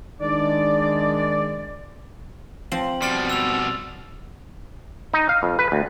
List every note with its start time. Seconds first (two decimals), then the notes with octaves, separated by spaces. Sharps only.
0.21 D#3 G#3 D4 D5
2.72 F3 C4 F#7
3.02 B2 G3 C6 F6 A6
3.29 E6 F7
5.14 D#4
5.29 F5
5.43 F2
5.59 B4
5.72 D2